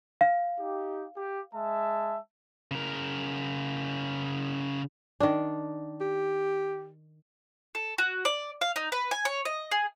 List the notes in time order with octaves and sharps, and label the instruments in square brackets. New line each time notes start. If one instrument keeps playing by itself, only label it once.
[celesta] F5
[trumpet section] D#4 G4
G4
G#3 E5 A5
[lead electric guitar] C#3 A#4
[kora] D#3 D4
[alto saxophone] G4
[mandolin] A4
F#4
D5
F5
D#4
B4
G#5
C#5
D#5
G#4